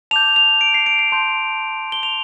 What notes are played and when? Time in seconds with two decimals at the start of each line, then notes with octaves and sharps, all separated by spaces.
0.11 A5 D6 G6 F7
0.36 F7
0.61 D7
0.74 C7
0.86 D7
0.99 C7
1.12 A5 C6 G6
1.92 G7
2.03 F7